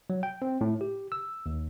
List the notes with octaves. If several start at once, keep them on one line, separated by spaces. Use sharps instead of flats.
F#3
G5
C4
A2
G4
E6
D#2